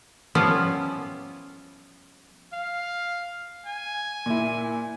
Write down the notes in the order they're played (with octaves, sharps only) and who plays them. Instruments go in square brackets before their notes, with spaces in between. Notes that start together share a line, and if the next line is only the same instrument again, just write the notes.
[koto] F3 G3 B3 C#4 E4 F4
[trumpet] F5
G#5
[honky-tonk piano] A#2 E4